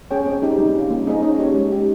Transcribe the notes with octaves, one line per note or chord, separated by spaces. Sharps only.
C#4 G#4 C#5 G5
C4
D#4 G4
G3
C#4 F4
A#3
D#4 G#4 C5 D#5
C#4
G4 C#5
G#3
D#4 G4